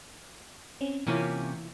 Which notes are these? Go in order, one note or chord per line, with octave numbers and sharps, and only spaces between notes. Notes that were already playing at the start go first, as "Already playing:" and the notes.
C4 C#4
C3 E3 A#3 C#4 E4 F4